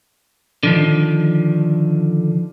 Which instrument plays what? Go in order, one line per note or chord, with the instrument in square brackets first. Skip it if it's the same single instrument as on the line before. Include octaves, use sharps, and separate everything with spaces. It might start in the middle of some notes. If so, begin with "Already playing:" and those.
[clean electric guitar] D3 D#3 F3